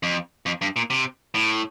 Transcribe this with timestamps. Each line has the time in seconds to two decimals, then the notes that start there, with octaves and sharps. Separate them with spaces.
0.03 F2
0.46 F2
0.62 G2
0.76 A#2
0.90 C3
1.34 A2